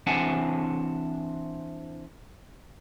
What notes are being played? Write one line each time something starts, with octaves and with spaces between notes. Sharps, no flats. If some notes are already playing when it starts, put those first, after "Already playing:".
E3 C4 D4 F#5 G#5 A5